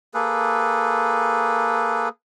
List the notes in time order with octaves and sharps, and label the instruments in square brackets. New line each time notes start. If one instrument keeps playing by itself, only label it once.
[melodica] A#3 G#4 A4 B4